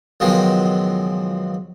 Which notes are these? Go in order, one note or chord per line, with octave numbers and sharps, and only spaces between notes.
C#2 B2 D#3 F3 F#3 G#3